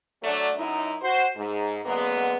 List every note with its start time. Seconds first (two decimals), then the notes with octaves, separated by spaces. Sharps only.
0.23 F#3 A3 D4
0.57 F#2 D#4 E4
1.01 F#4 C5
1.36 G#2
1.85 F#2 D3 G#3 A#3 B3